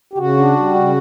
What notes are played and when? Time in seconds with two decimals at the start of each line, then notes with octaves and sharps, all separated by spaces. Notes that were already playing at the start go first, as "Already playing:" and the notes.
0.14 G4
0.18 C#3 F#4
0.37 D4
0.56 G3
0.75 C#3